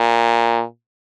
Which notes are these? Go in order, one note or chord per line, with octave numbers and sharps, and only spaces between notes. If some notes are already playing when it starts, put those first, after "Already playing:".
Already playing: A#2